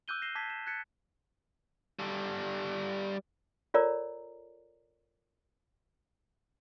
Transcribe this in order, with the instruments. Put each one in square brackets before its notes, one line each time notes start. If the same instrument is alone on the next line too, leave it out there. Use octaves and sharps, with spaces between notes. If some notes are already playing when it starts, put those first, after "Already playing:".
[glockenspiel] D6 E6 F#6 G6 D#7 G7
A#6 C7 E7 G7
A5 D6 G#6 A#6 B6
E7
F#6 G#6 A6 B6 C#7
[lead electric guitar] G3 A4
[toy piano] F4 A4 A#4 C#5 D5 A#5